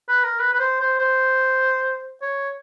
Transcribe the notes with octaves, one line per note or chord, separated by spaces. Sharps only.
B4
A#4
B4
B4
C5
C5
C5
C#5